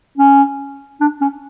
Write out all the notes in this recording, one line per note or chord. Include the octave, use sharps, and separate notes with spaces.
C#4
D4
C#4